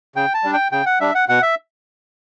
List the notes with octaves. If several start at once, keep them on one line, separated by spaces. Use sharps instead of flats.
C#3 G5
A5
G3 D4
G5
C#3 G5
F#5
G3 D4 E5
F#5
B2 F#5
E5